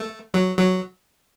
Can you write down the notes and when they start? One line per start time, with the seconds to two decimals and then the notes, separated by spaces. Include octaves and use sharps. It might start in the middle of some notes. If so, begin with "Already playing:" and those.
Already playing: A3
0.34 F#3
0.58 F#3